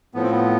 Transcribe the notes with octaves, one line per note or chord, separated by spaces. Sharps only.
A2 F3 B3
C4
B3